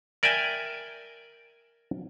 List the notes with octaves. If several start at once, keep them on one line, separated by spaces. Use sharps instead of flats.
A#4 D5 E5 G5 G#5